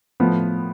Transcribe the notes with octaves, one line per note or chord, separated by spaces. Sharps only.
A2 F3 B3